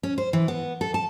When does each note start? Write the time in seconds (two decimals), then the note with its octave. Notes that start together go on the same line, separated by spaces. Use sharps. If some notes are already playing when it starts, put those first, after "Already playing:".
0.03 C#4
0.18 C5
0.33 E3
0.48 B3
0.81 A4
0.94 A5